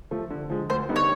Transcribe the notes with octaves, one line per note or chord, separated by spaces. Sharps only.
F3 A3
D3
F3 G#3
D2 C5
D3 G3 B3 D#4
C#5